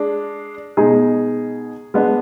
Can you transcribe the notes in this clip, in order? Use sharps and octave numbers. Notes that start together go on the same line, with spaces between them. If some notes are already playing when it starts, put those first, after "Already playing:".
Already playing: G#3 D4
B2 G#3 D#4 G#4
G#3 B3 D4